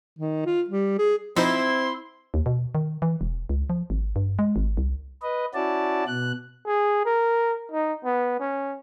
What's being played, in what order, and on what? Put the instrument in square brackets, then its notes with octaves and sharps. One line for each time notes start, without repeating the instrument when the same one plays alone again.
[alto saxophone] D#3
F4
G3
G#4
[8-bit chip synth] F3 D#4 C5 [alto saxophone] C4 [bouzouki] E4 [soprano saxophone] C6
[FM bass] D#2
B2
D#3
E3
E1
C#2
F3
G#1
G2
G#3
G#1
C2
[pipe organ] B4 D#5
C#4 E4 F#4 D5 A5
B2 F#6
[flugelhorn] G#4
A#4
D#4
B3
C#4